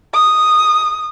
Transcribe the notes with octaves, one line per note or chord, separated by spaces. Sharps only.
D#6